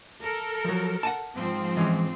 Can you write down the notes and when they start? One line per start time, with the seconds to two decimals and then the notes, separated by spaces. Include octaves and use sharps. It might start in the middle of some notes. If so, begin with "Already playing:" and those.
0.22 A4 A#4
0.65 F3 F#3
1.03 F#5 G#5 A5
1.35 G#2 F3 C4
1.77 E3 G#3 C#4